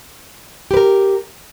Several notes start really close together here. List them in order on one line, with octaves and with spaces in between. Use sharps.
G4 B4 A#4